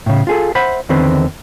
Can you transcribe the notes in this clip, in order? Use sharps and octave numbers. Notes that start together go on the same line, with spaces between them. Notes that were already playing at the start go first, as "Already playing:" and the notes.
A2 C#3
F4 G#4 A4
C5 E5 F#5 B5
E2 D3 D#3 C4 B4